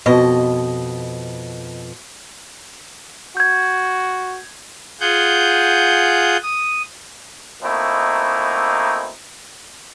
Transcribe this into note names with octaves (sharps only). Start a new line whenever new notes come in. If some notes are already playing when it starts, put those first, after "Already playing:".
F2 B2 D#5
F#4 G6 G#6
F4 G#4 F#5 G6
D#6
B2 A3 A#3 C4 D#4 E4